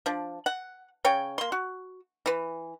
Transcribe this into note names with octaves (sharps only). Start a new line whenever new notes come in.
F3 D4
F#5
C#3 C#5 G5
A#3 C6
F#4
E3 B4